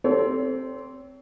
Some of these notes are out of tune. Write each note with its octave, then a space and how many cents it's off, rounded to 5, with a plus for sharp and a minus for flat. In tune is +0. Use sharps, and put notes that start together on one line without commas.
C4 -5 A4 +0 C#5 +35